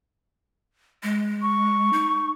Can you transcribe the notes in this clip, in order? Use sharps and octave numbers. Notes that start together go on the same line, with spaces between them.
G#3
C#6
D#4